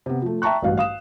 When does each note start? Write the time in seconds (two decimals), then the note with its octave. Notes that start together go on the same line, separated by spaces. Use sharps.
0.06 C3 B3
0.22 F3 A3
0.42 E5 G5 A5 A#5 C#6 F#6
0.62 A1 G2 F#4 F5
0.77 F5 D#6 E7